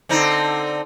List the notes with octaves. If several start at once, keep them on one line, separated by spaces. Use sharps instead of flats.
D3 C4 D#4